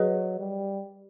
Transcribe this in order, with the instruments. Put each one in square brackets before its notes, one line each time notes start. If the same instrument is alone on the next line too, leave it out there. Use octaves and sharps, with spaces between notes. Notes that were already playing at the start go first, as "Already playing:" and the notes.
Already playing: [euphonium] F#3 [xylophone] G#4 B4 D#5
[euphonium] G3